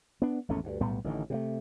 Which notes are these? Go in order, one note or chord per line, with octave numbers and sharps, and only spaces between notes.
B3 D4
G#1 E2 A3 C#4
D2 G2
B1 A2 G3 B3
A1 D3 D#3
C3 E3 A3